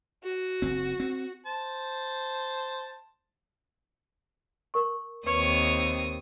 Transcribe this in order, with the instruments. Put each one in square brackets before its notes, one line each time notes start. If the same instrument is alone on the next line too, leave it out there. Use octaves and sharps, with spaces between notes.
[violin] F#4
[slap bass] F#1 C4
C4
[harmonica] C5 A5
[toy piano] A#4 C#6
[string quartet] D#2 C4 D#6 [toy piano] B4 C#6 [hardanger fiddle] C#5